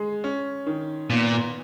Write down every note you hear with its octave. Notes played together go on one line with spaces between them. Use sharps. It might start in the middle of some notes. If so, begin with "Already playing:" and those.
Already playing: G#3 G#4
C#4
D#3
A#2 B3